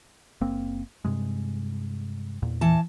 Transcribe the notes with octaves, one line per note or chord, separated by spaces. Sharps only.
F#1 A#3 C4
G2 C3 G#3
E2 A#2
E3 A5